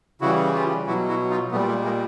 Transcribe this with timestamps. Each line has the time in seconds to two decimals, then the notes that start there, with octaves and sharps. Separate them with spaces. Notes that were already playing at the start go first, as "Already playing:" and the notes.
0.21 C#3 E3 G3 E4 F#4
0.54 F4 G4
0.87 B2 F#3 E4 F#4
1.09 E4 F#4
1.30 D#4 F4
1.51 A#2 A3 B3
1.55 G3
1.68 G#3 A#3
1.85 G#3 A#3